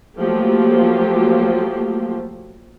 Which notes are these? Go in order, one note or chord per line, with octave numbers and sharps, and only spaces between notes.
F3 F#3 A3 A#3 F4 G4